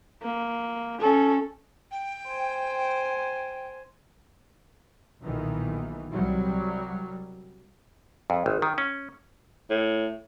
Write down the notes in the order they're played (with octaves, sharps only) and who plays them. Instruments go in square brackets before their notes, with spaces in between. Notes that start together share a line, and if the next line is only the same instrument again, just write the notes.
[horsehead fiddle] A#3
C#4 A4
[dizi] G5
[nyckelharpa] C5 G#5
[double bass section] B1 A#2 D#3 E3
C2 F#3 G3
[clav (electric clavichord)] F2
G#1
D#3
C#4
[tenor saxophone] A2